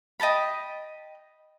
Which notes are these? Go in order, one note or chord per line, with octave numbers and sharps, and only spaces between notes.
D#5 G5 A5 B5